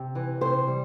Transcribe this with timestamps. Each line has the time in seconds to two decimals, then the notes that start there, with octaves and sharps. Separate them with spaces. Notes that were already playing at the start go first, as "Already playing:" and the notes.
Already playing: C3
0.15 E3
0.41 C3 C5
0.67 G3